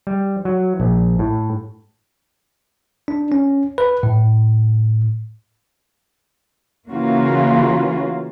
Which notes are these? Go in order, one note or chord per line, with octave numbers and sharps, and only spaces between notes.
G3
F#3
A#1
A2
D4
C#4
B4
A2
C#3 E3 A#3 C#4 F4 F#4